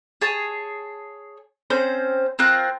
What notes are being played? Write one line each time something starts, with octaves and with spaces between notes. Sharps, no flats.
G#4 C#5 A5
C4 C#4 C5
C4 F4 A#4 F#6